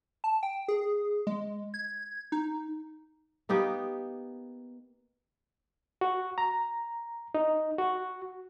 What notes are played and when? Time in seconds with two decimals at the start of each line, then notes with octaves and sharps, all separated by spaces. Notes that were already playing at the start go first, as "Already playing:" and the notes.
0.24 A5
0.43 G5
0.68 G#4
1.27 G#3
1.74 G#6
2.32 D#4
3.49 A#3 B3 D#4 G4
6.01 F#4
6.38 A#5
7.35 D#4
7.78 F#4